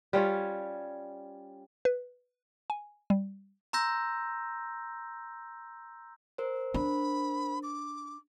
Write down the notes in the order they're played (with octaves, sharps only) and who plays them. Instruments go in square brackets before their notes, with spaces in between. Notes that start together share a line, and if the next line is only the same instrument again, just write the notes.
[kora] G3 C#4 F4 C#5
[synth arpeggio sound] B4
G#5
G3
[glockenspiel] A#5 C6 E6 G6 A#6
[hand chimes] A#4 C5
[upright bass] D4 [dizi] B5
[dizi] D6